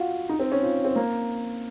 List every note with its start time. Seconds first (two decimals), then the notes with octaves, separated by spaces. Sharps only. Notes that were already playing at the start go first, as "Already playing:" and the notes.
Already playing: F4 F#4
0.29 D#4
0.40 C4
0.52 C#4
0.63 F4
0.85 C4
0.96 A#3